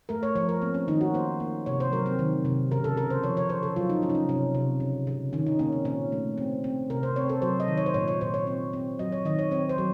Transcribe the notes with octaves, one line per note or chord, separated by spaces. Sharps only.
A3 A#4
C#5
F3 C#5
A#4
A#3 C4
C#4
D#3 D#4
F#4
A#3 C5
A#3
C3 C#5
C5
F#3 A#4
C4
D#3
C3
C#3 A#4
A4
C#3 A#4
C5
F3 C#5
C#5
C#3 C5
A4
F#3 F4
D#4
C#3 C#4
D#4
C#4
C3 C#4
C3
C#3
C#3
D#3 C#4
D#4
A#3 C#4
C4
A#2 C#4
A3
C4
C4
C3 A#4
C5
C4 C#5
A4
F#3 C5
D#5
D#3
C#5
C5
A#2 C#5
C#5
A#2 C5
C#5
C4
C4
F#3 D#5
C#5
D#3 D#5
C#5
C4 C#5
C5
F#3